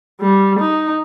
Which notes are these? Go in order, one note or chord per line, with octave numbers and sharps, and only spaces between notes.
G3
D#4